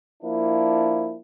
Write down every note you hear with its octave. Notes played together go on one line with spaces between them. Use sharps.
F3 A#3 D4 E4